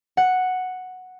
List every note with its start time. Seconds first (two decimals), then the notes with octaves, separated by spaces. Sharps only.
0.17 F#5